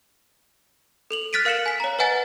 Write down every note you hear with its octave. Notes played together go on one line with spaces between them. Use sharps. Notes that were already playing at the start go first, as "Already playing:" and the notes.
A4 F7 F#7
F6 F#6 A6 B6 D7 D#7
A#4 F5 F#6 C#7 E7 F#7
G#5 B6
C#5 A#5
B4 D#5 F#5 G#5 A6